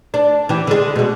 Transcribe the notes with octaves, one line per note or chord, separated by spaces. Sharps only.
D4
E3 G4
D3 G#3
B2 G#3